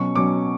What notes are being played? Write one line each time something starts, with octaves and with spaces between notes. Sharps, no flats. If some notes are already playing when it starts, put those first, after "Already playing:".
Already playing: B2 F#3 C#4 C#6
B2 F#3 C#4 D6